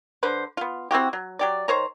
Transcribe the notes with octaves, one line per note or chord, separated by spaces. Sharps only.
D3 B4 C5
B3 F4
C4 E4 F#4 G4
F#3
F#3 G4 D5
D#3 C5 C#5 A#5